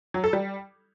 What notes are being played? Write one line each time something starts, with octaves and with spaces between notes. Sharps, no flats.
F#3
A4
G3